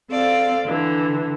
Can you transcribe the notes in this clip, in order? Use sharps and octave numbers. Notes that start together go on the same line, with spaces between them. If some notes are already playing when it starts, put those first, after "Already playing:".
C4 A4 D5 F5
D3 E3